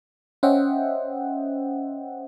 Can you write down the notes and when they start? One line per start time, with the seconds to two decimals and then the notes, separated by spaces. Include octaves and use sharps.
0.43 C#4 C5 D#5 E5 F#5 G5